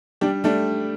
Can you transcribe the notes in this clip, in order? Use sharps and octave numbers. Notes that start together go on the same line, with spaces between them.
G3 D4 G4
G3 A3 D4